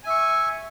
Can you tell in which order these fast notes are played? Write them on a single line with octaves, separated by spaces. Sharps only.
G#5 E5 C#6